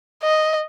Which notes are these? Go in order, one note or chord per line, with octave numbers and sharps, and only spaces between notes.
D#5